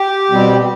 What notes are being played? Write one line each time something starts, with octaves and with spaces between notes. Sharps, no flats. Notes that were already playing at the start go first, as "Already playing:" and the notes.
Already playing: G4
B2 G3 C4